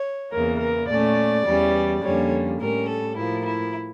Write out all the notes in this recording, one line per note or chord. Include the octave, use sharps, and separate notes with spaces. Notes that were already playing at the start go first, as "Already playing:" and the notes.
Already playing: C#5
E2 C#3 E3 A#3 A#4
A#4
A#2 A3 C#4 D5
E2 E3 G3 C#4
F2 D3 G3 A#3 C#4 C#5
A2 G3 C#4 A#4
A4
A2 F3 A#3 E4
E4